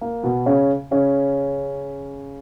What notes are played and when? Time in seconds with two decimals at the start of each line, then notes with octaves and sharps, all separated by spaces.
0.01 A#3
0.23 B2 B3
0.46 C#3 C#4
0.91 C#3 C#4